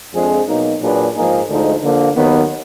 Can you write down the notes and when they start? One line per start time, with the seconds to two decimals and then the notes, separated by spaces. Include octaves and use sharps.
0.14 F2 F3 G#3 D4 G#4
0.47 B2 F#3 A#3 D#4
0.81 A#2 F#3 D4 G#4 B4
1.15 G#2 F3 A#3 D#4 G#4
1.49 D2 D3 F3 G#3 D#4
1.82 D3 F3 A#3
2.16 D#2 D#3 F#3 B3